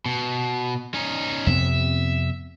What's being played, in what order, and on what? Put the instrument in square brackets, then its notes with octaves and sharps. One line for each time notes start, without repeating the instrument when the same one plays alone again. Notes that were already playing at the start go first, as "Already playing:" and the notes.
[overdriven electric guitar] B2
C#4 D#4
[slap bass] F2 C3 B3 [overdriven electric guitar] E5